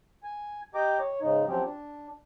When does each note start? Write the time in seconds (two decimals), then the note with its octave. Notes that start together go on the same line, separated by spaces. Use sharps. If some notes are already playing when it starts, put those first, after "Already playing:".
0.23 G#5
0.75 G4 D#5 G5 A#5 D6
0.99 C#5
1.21 G#2 C#3 D#4
1.47 F3 F#3 C4 C#4 G4
1.64 D4